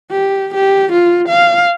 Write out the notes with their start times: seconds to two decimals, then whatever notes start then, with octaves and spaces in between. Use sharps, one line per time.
0.11 G4
0.55 G4
0.92 F4
1.28 F5